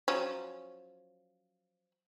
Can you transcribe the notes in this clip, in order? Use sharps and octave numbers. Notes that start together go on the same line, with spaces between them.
F3 F#3 C#4